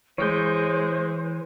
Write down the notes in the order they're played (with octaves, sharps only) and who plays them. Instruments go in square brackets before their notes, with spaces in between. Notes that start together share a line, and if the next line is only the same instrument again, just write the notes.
[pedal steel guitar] E3 [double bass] G#3 [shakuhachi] C5 [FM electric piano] C#5 G6